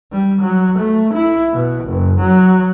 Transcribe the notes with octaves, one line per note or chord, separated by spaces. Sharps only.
G3
F#3
A3
E4
B2
F#1
F#3